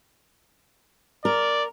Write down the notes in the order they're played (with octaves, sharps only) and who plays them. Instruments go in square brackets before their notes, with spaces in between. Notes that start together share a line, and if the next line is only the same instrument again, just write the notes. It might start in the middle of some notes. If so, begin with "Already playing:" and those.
[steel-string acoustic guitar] A#4 [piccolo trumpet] D5